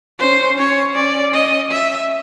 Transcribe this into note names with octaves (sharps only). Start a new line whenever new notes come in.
C#4 C5
C#4 C#5
D5
D#5
E5